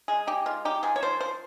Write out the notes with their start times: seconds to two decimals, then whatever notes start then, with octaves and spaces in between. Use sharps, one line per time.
0.08 G#3 G#4
0.27 D#4 G4
0.46 G#3 F4
0.65 D#4 G4
0.83 F3 G#4
0.96 C#5
1.03 F3 C5
1.21 F3 C5